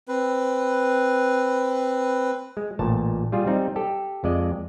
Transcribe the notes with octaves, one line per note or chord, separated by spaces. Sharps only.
C4 B4
G#3
A1 A#2 A5
G3 F4 G#4
G3 C4 D#4
G4 A4
F2 G#3 D5 D#5